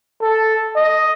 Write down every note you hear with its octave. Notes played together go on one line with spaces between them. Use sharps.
A4
D#5